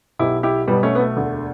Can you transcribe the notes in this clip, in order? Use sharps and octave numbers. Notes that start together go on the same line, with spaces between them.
B1 B2 E4 G4
E4 G4
B1 B2 G3 B3
A3 C#4
B3
A3
E1 D2 D3